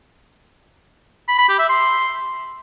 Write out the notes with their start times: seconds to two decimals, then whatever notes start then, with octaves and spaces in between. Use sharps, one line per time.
1.28 B5
1.38 B5
1.49 G4
1.59 E5
1.69 C6